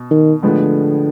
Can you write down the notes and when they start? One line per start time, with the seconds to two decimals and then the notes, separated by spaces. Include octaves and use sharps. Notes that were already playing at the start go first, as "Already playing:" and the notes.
Already playing: B2
0.11 D#3
0.43 A2 D3 F3 G#3 B3